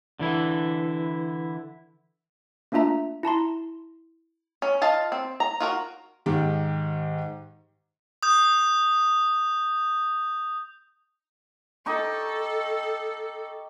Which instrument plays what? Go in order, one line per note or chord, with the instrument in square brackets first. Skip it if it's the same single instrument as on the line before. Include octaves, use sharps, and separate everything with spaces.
[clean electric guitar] D3 E3 E4
[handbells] A3 A#3 D4 F4 E5 A#5
E4 A5 A#5 C6
[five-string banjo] C#4
F4 D#5 F5 A5
C4
A#5
F4 F#4 A#4
[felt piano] G#2 D#3 G4
[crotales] D#6 G6
[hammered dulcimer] D#4 G4 C#6 [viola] A4